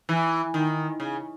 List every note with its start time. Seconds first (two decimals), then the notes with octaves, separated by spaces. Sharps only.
0.09 E3
0.54 D#3
1.00 C#3